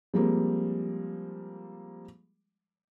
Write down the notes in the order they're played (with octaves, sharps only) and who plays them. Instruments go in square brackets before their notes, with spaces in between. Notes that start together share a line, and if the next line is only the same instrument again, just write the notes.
[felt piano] F3 G3 G#3 A#3 C4